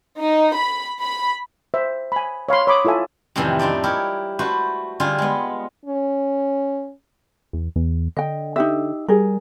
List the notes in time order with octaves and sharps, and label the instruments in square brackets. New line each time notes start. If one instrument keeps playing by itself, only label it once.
[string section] D#4
B5
B5
[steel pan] C5 E5
G#5 B5
C#5 F5 B5 C6
C#5 B5 D6 D#6
E4 F4 A4 E5 G#5
[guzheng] F2 A2 C3 D#3 E3 G3
C4 D4 D#4 D5
E4 G4 A#4 C#5
A3 F#4 B4 C5
D3 G3 F4 G#4
G#3 B3
[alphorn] C#4
[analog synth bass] E2
E2
[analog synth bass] D3 [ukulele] D#5 G5
[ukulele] D#4 G4 E5
[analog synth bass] G3 [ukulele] G#4 A#4